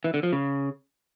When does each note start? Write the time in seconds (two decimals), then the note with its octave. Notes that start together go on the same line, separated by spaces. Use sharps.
0.04 E3
0.14 D3
0.23 F3
0.33 C#3